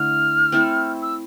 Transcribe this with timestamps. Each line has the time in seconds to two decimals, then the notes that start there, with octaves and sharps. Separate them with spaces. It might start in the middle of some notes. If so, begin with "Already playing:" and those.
Already playing: D3 A3 E4 F6
0.52 A3 C4 E4 A4
1.02 E6